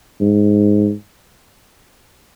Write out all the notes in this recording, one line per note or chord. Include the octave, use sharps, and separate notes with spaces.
G#2